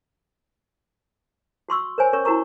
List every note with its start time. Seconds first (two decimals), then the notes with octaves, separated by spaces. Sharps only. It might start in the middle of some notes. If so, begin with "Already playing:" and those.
1.69 F#4 C6 C#6 E6
1.98 A#4 C5 C#5 G#5
2.13 C#4 A#4 C#5 C#6
2.25 E4 F#4 A#4 A#5 C#6